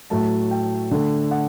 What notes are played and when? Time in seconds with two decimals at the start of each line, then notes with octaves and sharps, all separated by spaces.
0.10 A2 F#3 A3 A5
0.51 G5
0.91 D3 A3
1.31 F#5